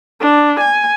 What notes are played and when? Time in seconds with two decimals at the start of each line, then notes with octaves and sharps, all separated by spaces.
0.21 D4
0.60 G#5